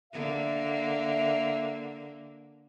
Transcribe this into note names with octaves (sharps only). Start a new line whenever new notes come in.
D3 A#3 E5